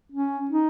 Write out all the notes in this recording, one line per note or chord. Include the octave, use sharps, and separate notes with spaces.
C#4
D#4